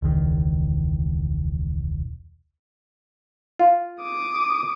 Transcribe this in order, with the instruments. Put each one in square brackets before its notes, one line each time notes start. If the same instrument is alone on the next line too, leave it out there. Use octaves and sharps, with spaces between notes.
[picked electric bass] E1 C#2 D#3
[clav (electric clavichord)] F4
[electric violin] D6 D#6